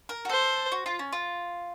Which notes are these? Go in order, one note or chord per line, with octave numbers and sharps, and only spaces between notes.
A#4
F#4
A4 C5
F#4
F4
C#4
F4